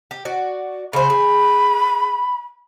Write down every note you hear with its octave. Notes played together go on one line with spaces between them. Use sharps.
G4
F#4 D5
C#3 C5 B5
G#4